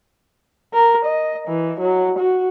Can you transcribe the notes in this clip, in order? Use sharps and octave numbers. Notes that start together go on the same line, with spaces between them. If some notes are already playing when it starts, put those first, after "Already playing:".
A#4
D#5
E3
F#3
F#4